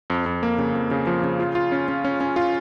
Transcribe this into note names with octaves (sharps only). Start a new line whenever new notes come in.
F2
F2
A#3
C#3
F2
C#3
F3
C#3
F4
F4
C#4
C#4
C#4
C#4
F4